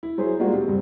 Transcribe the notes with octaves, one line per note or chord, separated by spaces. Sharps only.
E4
F#3 G#4 C5
G3 G#3 A#3 D4 F4 F#4
C3
G2 G3 C4